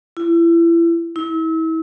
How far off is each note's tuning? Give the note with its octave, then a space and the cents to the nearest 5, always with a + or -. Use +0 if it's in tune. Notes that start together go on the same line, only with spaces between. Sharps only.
E4 +30
E4 -35